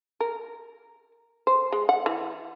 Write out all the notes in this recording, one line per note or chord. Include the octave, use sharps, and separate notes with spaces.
A#4
C5
G#3
F#5
E3